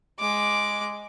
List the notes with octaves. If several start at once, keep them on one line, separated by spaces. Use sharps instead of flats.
G#3 D6